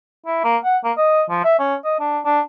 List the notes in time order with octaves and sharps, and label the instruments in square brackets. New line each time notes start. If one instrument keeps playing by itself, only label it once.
[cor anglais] E4
A#3
F#5
A#3
D#5
F3
E5
C#4
D#5
D4
D4